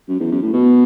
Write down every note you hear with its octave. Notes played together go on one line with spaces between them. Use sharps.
F#2
E2
F#2
A2
B2